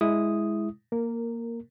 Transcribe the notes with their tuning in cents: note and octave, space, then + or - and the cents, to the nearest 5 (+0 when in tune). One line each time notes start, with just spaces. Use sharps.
G#3 +0 E4 -5 D#6 +0
A#3 +0 A#4 -15